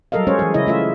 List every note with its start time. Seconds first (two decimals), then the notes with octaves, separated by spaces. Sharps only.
0.12 F#3 G3 A4 A#4 D#5 F5
0.27 G#3 C#4 C5 C#5
0.39 E3 G#4
0.54 C#3 E4 D#5
0.67 A3 F4 E5